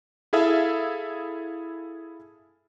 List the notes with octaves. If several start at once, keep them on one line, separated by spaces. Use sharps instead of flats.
E4 G#4 A4 E5 F5